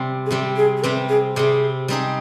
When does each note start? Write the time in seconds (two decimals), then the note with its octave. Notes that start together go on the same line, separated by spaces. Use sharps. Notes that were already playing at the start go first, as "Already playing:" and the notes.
Already playing: C3 G3 C4
0.26 G#4
0.31 C3 G3 C4 G4
0.56 G#4
0.77 G#4
0.83 C3 G3 C4 B4
1.09 G#4
1.36 C3 G3 C4 G#4
1.88 G3 C4 D#4 G#4